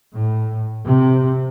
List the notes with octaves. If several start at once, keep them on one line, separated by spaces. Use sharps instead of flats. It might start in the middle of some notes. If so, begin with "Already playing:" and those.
A2
C3